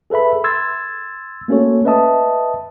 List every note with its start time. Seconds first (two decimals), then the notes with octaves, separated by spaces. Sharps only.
0.10 G#4 A4 B4 E5 B5
0.44 C6 E6 G#6 A6
1.48 A3 A#3 C#4 F#4 A4 C#5
1.85 B4 D#5 E5 A5 D#6